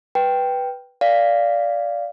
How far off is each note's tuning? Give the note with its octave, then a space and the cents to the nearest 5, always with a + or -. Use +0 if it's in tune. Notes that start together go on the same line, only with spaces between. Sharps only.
B4 -5 G5 +0
D5 -10 F5 -5